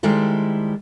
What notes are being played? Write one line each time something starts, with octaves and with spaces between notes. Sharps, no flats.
D#3 G3 G#3 E4 A4 C5